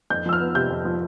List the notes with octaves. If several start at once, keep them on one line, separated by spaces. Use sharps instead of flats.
F2 G6
F3 E6
F6
B3
C3 G6
F2
F3